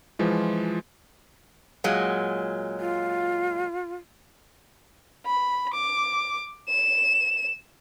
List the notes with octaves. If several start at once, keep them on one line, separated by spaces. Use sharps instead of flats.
E3 F3 G#3 F4
A#2 F#3 G#3
F4
B5
D6
E7